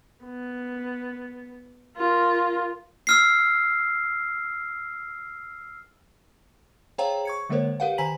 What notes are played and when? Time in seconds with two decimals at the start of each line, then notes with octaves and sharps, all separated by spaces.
0.24 B3
1.97 F4 A#4
3.07 E6 F6 C7
6.98 G#4 C5 C#5 F5 G5 A#5
7.25 C#6 G#6 C#7
7.50 D3 G#3 A#3 A#4 C5 C#5
7.80 G4 A#4 B4 F5 F#5
7.98 D#3 C5 G#5 A#5 B6 F#7